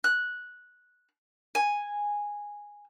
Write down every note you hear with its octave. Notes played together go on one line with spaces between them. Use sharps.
F#6
G#5